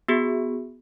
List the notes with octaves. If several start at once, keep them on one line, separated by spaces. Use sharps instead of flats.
B3 F#4 G#4